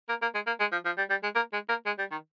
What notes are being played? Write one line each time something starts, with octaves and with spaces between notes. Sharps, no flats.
A#3
A#3
G#3
A#3
G#3
F3
F3
G3
G3
G#3
A#3
G#3
A#3
G#3
G3
D#3